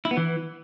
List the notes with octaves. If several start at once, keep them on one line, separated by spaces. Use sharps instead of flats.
E4
B3
E3